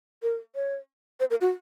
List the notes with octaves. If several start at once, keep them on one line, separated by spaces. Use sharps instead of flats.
A#4
C#5
C5
A#4
F#4